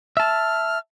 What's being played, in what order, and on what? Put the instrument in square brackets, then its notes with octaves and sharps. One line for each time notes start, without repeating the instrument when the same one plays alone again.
[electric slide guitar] E5 A5 [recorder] F6